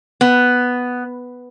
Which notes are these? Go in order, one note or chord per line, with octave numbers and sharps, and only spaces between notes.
B3